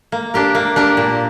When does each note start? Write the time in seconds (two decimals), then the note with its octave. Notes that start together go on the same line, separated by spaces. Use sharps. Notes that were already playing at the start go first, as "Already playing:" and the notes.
0.12 A#3
0.34 D4 G4 A#4
0.55 A#3
0.76 D4 G4 A#4
0.97 A#2